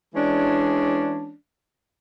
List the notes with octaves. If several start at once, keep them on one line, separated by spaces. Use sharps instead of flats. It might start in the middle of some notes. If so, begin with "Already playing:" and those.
E3 G#3 C#4 D4